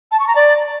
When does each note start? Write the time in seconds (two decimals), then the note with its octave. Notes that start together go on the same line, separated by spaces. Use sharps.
0.12 A5
0.20 C#6
0.28 A#5
0.36 D5